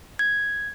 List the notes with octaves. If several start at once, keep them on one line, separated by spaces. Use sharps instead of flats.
G#6